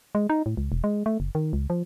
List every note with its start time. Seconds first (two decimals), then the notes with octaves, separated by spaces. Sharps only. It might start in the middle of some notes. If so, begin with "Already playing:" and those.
0.15 G#3
0.30 D#4
0.46 A2
0.57 C#2
0.72 E1
0.84 G#3
1.06 A3
1.20 F#1
1.35 D#3
1.53 C#2
1.70 F3